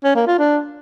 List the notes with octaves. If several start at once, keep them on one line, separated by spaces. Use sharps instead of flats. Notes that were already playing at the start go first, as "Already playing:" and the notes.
C#4
A#3
F4
D4